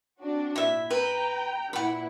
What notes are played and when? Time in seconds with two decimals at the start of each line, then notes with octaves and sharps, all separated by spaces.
0.20 C4 D4 F#4
0.56 A#2 E4 E5
0.90 B4 G5 A#5
1.73 A#2 E3 E4 F#5 B5